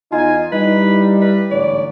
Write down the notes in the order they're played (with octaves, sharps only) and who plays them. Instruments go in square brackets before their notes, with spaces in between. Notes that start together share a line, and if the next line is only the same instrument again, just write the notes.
[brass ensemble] E2 G#5 [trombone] D#4 [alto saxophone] F4
[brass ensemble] G3 E4 [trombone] D#4 [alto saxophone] B4
[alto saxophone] B4
[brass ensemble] A1 G#2 D3 [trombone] C#5 [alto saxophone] D5